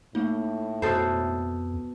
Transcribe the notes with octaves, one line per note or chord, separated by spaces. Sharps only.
A2 A3 A#3 D#4
F2 B2 A4 C5